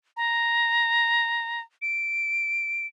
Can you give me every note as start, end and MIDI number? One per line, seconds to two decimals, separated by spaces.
0.17 1.61 82
1.82 2.87 98